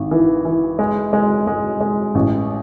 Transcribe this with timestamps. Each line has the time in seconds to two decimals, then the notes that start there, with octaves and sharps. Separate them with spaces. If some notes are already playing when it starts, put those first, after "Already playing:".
Already playing: G#1
0.11 E3
0.45 E3
0.79 G#3
1.13 G#3
1.47 G#3
1.81 G#3
2.15 A1